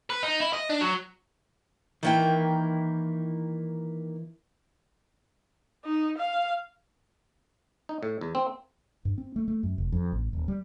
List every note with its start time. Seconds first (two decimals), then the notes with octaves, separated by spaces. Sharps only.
0.10 B4
0.23 D#4
0.40 E4
0.53 D#5
0.69 D4
0.81 F#3
2.03 D#3 E3 A#3 E4 G5
5.85 D#4
6.18 F5
7.89 D#4
8.03 A2
8.21 E2
8.35 C4
9.05 G2
9.18 C4
9.36 A3
9.48 A3
9.63 F#2
9.78 F1
9.92 F2
10.12 A1
10.33 D#1
10.48 G3